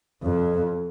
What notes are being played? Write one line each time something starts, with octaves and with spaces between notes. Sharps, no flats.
F2